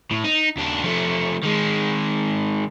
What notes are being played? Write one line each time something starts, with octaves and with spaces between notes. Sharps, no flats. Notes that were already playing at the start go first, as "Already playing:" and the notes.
A2
D#4
D#2 D4
F3 A3
D#3 G#3